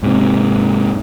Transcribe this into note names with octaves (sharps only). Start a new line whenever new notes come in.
G#2 C3